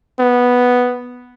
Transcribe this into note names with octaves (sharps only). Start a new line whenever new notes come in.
B3